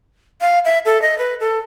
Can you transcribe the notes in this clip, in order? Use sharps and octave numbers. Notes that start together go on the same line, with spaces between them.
F5
E5
A4
D#5
B4
A4